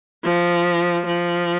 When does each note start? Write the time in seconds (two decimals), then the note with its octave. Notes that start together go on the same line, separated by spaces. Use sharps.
0.24 F3
1.06 F3